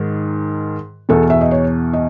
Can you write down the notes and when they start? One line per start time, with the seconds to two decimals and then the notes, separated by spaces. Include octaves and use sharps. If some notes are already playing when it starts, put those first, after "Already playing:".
Already playing: G#2 D#3
1.09 E2 B2 A4
1.30 E5
1.41 D#5
1.51 C#5
1.93 D#5